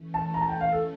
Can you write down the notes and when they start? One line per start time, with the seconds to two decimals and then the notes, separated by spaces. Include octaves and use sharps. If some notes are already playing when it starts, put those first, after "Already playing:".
Already playing: E3 A3 C#4
0.14 A5
0.34 A#5
0.41 A5
0.49 G5
0.61 F5
0.72 A4